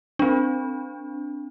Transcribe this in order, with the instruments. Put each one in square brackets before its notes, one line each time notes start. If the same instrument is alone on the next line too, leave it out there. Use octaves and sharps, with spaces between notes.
[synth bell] C4 D4